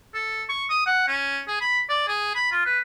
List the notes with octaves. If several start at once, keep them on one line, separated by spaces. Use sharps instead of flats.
A4
C#6
D#6
F#5
C#4
G#4
B5
D5
G#4
B5
F4
B4